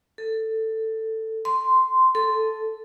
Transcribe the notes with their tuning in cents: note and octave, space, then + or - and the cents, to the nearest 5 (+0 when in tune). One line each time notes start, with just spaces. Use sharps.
A4 +10
C6 -10
A4 -5